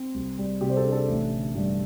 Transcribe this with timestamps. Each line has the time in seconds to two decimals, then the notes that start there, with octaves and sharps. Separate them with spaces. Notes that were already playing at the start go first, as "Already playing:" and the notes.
Already playing: C4
0.14 C2
0.38 G3
0.61 C3 G4
0.70 C5
0.77 A4
0.85 D4
0.92 A4
1.08 A1
1.31 D3
1.55 G2